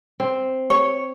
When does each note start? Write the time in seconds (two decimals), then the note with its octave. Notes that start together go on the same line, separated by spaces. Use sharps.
0.20 C4
0.70 C#5